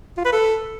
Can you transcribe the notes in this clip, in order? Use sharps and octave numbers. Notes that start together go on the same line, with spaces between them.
F4
B4
A4